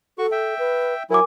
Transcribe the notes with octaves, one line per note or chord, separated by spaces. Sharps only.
F#4 A4 C#6
E5 G5
B4
F#3 E4 A#4 G#5 D6